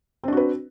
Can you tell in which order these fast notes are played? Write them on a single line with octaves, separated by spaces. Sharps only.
C4 D4 F#4 B4